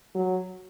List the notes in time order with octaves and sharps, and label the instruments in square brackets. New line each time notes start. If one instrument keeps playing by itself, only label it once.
[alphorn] F#3